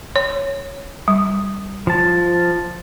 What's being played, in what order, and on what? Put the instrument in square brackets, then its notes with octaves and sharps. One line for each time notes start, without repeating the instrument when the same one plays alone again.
[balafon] C#5
G3
[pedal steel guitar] F3 A5